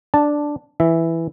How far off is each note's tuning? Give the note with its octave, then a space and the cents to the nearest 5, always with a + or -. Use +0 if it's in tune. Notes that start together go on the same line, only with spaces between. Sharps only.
D4 +0 A5 +0
E3 +0 E5 +0